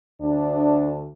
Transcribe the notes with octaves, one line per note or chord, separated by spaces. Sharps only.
D2 D4